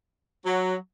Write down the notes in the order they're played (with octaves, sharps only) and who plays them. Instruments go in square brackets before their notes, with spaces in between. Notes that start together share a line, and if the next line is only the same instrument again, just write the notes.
[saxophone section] F#3